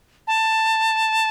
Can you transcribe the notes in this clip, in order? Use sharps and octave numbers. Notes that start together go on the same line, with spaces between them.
A5